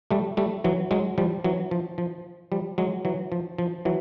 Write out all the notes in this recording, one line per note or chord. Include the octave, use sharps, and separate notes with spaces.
G3 A3
G3 A3
E3 F#3
F#3 G#3
F3 G3
E3 F#3
F3
F3
F3 G3
F#3 G#3
E3 F#3
F3
F3
E3 F#3